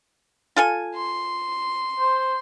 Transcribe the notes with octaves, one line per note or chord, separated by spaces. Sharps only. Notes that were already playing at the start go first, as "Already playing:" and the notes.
F4 A4 G#5
C6
C5